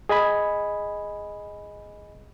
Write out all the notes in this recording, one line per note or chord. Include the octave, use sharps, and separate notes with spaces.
G#4 D#5 G#5 B5